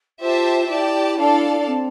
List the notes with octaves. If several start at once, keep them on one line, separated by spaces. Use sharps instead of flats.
F4 G4 C5 E5 A5
E4 G4 D5 A5
D4 A4 D5 F5 A5
C4